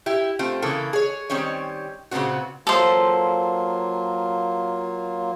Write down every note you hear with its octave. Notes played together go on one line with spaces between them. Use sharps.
E4 G4
A3 C4 F4
C#3 E3 A#3 A4
G#4 C#5
D#3 G3 C4 C#4 C#5
A#2 C#3 A3 B3 C4 F#4
F#3 A#3 F4 A4 C5